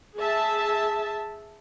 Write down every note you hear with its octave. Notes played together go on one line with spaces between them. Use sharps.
G#4 E5 A5